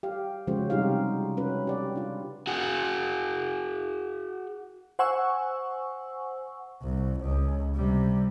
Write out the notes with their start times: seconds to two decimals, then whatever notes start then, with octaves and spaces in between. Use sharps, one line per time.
0.03 G4 F5
0.47 C#3 F3 G#3 C#4 F#4 C5
0.70 C3 G3 D#4 F4 G4 F5
1.37 C#4 F#4 B4
1.67 G4 D5 F#5
1.96 D4 F4
2.47 F#4 G#4
4.99 C5 F#5 G#5 C#6 E6
6.82 C2
7.21 C#2
7.75 C3 G3